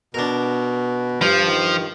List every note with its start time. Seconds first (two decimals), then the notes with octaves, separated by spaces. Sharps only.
0.14 B2 D4 A#4
1.21 G2 F3
1.46 D#3